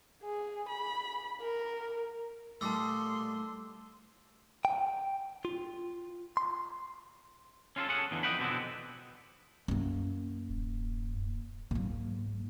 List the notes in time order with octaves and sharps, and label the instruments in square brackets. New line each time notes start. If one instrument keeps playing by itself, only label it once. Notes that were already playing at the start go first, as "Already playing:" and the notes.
[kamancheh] G#4
B5
A#4
[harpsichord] A#2 G3 D#4 [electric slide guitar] A3 [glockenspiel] A5 E6 [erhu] C6
[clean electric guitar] G5
F4
C6
C#4 F4 G#4 A4
C#4 G#4 A4 F#5
E2 D3 E3
F2 D#5 F#5 G5 B5
B2 D3 B3 C4 E4
[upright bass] F#2 A#3
[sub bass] D1
[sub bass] G#2 [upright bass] F#3 A#3